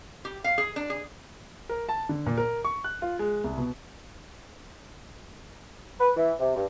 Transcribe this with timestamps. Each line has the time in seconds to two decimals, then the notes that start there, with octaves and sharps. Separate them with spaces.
0.25 G4
0.44 F5
0.58 G#4
0.76 D4
0.90 G#4
1.69 A#4
1.89 A5
2.09 D3
2.26 A#2
2.38 A#4
2.65 C#6
2.84 F#6
3.02 F4
3.19 G#3
3.44 C2
3.58 B2
6.00 B4
6.17 E3
6.40 C3
6.55 G2